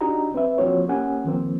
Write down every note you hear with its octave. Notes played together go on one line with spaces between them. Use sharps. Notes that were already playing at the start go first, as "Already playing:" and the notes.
D4 D#4 F#4 G4 D#5 A#5
C4 B4 E5
F3 A#3 C4 F4 F#4 C#5
A#3 C#4 G4 F#5 G#5
D#3 F3 A#3 C4